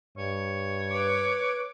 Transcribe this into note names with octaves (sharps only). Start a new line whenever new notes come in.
G2 C#5
B4 D6